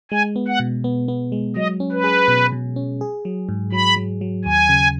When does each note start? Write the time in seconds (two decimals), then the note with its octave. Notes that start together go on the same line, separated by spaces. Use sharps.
0.12 G#3 G#5
0.36 B3
0.48 F#5
0.60 B2
0.84 B3
1.08 B3
1.32 G#3
1.56 F#3 D#5
1.80 C#4
1.92 B4
2.04 G#4
2.28 B2
2.52 B2
2.76 C#4
3.01 G#4
3.25 F#3
3.49 G#2
3.72 F#3 B5
3.96 F#3
4.21 F#3
4.45 D#2 G#5
4.69 C#3